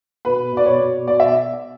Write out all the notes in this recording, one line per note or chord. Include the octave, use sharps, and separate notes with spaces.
B2 B4
B2 D5
C#5
B2
B2 D5
E5